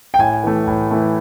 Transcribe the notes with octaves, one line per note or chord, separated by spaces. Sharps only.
G5
A2 G#5
E3 A3
A2
E3 A3